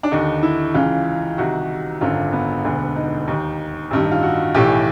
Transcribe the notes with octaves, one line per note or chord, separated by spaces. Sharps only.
D4
D#2 D3 D#4
E4
C#2 C#3 E3 F4
C2 C3 D#3 F#4
G#1 F#2 D3 F4
B3
E1 D2 D3
D#4
D#2 D#3
A1 G2 D#3
F4
F#4
B1 A2 E3 G4